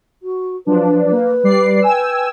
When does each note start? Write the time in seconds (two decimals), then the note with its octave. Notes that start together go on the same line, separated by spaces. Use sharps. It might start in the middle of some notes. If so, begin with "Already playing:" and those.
0.22 F#4
0.66 F3 F#3 D4 B4
1.12 A#3
1.44 G3 D5 C7
1.82 G5 G#5 E6